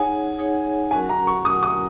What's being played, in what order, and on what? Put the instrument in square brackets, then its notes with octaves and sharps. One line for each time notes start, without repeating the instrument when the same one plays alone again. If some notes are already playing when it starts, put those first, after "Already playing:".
Already playing: [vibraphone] D#4 G#4 C#5 F#5 [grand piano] G#5
[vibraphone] D#4 G#4 C#5 F#5
[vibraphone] F#3 C#4 F#4 A#4 F#5 [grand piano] G#5
[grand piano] A#5
C#6
[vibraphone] F#3 C#4 F#4 A#4 F#5 [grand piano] D#6
[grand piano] D#6